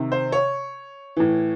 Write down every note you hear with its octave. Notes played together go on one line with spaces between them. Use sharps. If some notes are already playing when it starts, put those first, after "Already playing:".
Already playing: C3 D#3
C5
C#5
A2 E3